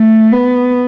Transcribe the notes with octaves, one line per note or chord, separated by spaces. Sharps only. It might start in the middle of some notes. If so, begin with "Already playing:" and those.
Already playing: A3
B3